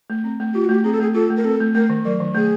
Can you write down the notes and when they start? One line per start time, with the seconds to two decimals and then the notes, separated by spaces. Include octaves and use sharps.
0.10 A3
0.24 C4
0.40 A3
0.54 F4 G4
0.64 A3 F#4
0.74 G4
0.84 C4 G#4
0.93 A4
1.00 A3 G#4
1.14 F4 A4
1.30 A3
1.37 A#4
1.44 C4 A4
1.60 A3
1.75 A3 A#4
1.90 D#3
2.05 F#3 A#4
2.20 D#3
2.35 A3 G#4